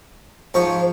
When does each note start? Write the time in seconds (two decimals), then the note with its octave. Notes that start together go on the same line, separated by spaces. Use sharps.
0.54 G#2 F3 C5 C#6